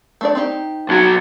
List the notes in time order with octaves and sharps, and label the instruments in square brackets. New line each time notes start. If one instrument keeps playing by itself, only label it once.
[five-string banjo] A3 D4 D5
C4 D#4 G4
[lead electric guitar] B1 F#3